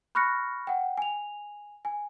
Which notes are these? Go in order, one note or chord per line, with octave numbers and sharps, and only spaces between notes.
B5 C#6 F6 F#6 A#6 C#7
F#5 G5
G#5 F7
G#5